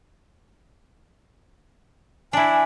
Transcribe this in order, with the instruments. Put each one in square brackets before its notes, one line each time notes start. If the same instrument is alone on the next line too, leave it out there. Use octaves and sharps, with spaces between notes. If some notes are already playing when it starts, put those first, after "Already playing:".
[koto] D4 E4 [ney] G#5